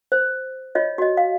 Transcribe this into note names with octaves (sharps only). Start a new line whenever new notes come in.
C5
F4 C#5 D#5
F#4 D#5
F5